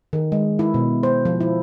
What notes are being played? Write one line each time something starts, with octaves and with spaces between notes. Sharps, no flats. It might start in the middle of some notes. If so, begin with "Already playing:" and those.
D#3
G#3
E4
B2
C5
F3
E4